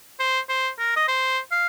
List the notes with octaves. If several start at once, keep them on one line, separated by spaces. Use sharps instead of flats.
C5
C5
A#4
D#5
C5
F5